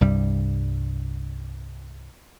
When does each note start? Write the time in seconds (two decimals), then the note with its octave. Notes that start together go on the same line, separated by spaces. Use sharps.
0.01 C2 G2 G3